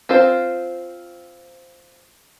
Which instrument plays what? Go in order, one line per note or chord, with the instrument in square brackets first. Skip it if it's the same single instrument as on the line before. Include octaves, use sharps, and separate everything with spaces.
[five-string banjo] C4 F4 C5